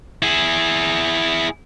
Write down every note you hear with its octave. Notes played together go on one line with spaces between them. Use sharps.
E4 G#4